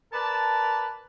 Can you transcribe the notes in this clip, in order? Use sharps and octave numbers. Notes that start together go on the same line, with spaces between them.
A#4 B4 D5 A5